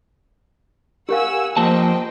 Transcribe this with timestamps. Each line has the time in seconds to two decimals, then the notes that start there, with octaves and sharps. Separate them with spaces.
1.09 G4 A#4 F5 F#5 G#5 E6
1.57 F3 A#3 C5 D#5 G5 A5